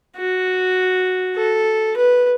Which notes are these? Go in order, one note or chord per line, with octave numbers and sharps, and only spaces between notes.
F#4
A4
B4